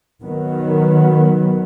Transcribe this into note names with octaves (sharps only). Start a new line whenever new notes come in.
D#3 F#3 B3